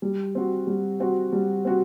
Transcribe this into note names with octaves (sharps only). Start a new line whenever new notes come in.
G3
C4 F#4
G3
C4 F#4
G3
C4 F#4